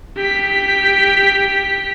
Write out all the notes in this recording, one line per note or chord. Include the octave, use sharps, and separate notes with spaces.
G4 B6